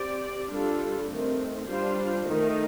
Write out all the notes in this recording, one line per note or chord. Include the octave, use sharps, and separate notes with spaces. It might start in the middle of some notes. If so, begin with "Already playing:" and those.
Already playing: C4 G4 D5
G3 D4 F4 A4
D#3 A3 C4
G3 D4 F4 C5
D#3 A3 D#4